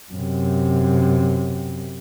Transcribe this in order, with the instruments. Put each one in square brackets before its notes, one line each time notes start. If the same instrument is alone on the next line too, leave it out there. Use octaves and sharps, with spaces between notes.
[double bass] F#2 C3